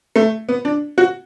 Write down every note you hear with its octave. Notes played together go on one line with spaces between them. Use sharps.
A3
B3
D4
F#4